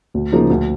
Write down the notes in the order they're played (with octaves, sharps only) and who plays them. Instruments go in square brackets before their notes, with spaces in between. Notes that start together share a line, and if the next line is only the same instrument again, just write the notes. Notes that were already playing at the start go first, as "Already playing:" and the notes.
[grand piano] D2
C#3 F3 A#3 D#4
D2